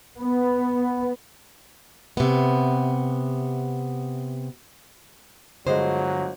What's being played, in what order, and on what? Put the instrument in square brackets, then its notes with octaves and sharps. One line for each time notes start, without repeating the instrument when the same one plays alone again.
[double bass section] B3
[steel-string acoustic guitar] C3 B3
[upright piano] G1 G#3 D#5 [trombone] F#3 [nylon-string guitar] C5